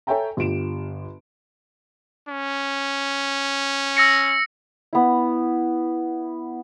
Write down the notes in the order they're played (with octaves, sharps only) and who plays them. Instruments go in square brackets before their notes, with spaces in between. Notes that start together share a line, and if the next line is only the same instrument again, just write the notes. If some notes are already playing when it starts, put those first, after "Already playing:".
[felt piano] A4 C#5 E5 G5 G#5 A#5
G1 F4 G4 D7 E7
[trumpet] C#4
[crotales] E6 A#6 C#7
[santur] B3 E4